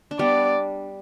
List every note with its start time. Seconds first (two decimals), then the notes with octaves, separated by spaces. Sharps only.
0.11 D4
0.19 G3 B3 D5